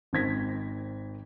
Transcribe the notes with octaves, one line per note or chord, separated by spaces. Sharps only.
G#1 D#3 C5 G#6 A#6 B6